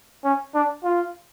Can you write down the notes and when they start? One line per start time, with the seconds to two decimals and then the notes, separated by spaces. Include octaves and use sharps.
0.24 C#4
0.55 D4
0.84 F4